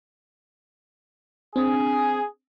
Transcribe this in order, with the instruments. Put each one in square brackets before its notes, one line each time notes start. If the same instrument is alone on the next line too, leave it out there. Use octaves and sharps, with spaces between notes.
[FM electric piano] C4 D4 [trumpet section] G#4